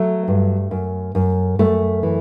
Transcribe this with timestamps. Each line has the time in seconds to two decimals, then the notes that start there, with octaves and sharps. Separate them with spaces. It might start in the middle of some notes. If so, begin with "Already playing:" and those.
Already playing: F#3 A3
0.28 G2
0.71 F#2
1.15 F#2
1.59 F#2 A3
2.03 E3